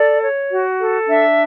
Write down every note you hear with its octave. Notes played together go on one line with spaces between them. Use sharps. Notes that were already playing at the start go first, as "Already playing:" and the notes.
Already playing: A4 D5
C#5
F#4
A4
D4 E5